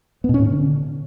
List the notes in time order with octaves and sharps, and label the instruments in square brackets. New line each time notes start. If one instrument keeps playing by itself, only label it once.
[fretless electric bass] B3
B2
C#4
A2
D3